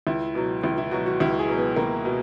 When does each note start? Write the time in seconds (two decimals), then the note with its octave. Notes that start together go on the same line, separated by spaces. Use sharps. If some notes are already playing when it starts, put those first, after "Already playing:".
0.07 C#2 E4
0.35 B2 F#3
0.63 C#2 E4
0.78 E4
0.91 B2 F#3 F#4
1.06 F#4
1.20 C#2 E4
1.39 G#4
1.49 B2 F#3
1.58 B3
1.76 C#2 A#3
2.05 B2